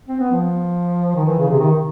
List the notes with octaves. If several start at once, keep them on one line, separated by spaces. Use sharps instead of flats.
C4
B3
F3
D#3
E3
C#3
C3
D#3